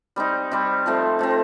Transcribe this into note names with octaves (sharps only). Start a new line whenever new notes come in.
G3 C4 D#4
G3 C4 D#4
F3 A3 C4
F3 A3 C4